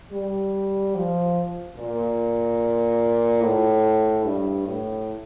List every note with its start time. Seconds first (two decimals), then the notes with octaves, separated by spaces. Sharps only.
0.12 G3
0.96 F3
1.77 A#2
3.43 A2
4.24 G2
4.67 A2